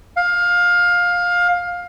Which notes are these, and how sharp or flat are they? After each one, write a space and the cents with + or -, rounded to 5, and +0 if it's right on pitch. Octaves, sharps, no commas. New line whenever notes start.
F5 +20